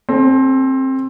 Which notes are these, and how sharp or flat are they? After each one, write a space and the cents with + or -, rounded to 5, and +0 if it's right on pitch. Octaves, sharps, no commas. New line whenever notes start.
C4 +20 A4 -35